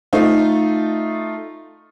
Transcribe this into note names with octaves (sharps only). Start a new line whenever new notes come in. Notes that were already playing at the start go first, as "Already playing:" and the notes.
A3 D#4 F4